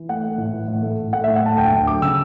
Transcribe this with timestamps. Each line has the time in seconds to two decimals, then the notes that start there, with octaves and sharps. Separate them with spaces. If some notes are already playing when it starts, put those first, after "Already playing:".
Already playing: E3
0.09 A3 F#5
0.23 A3
0.38 A2
0.53 E3
0.68 A2
0.83 A3
0.99 A2
1.13 A3 F#5
1.24 A2 E5
1.36 F#5
1.42 A3 A5
1.58 D2 G5
1.72 D2
1.87 F#3 D6
2.02 C#3 E6